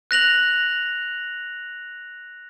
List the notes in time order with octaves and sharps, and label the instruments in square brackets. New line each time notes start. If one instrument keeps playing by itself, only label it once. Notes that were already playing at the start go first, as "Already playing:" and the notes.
[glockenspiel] F#6 A#6 F7 F#7